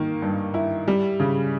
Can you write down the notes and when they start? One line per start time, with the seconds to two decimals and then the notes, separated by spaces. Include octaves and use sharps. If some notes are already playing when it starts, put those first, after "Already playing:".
Already playing: D#3 A#3
0.22 G2
0.54 E4
0.88 G3
1.20 C#3